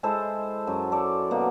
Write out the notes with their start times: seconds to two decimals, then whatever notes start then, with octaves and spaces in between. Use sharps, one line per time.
0.03 G#3 E4 A4 C5
0.67 F#2
0.92 A4 D5
1.31 B2 A#3